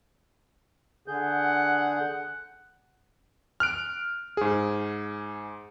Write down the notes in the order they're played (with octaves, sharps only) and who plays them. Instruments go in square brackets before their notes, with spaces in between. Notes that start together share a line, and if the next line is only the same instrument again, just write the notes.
[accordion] D3 G#4 G6 [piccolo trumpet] F#5
[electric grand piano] F6 F#6 D7
G#2 G#4